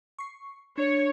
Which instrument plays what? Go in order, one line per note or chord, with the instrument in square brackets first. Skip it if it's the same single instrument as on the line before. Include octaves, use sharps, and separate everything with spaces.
[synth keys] C#6 C7
[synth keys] D4 [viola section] C#5